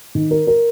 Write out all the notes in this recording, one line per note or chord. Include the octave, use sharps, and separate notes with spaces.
D#3
A#4
A#4